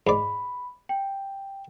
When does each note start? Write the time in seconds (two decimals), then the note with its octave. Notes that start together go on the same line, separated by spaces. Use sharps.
0.07 G#2 D5 B5
0.89 G5